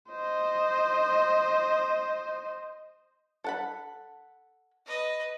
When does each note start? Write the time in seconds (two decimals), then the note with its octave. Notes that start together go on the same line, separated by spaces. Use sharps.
0.10 C5 D#5
3.44 A4 F#5 B5
4.86 B4 D#5